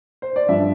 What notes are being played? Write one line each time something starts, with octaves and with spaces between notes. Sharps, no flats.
C5
D5
G2 F3 E5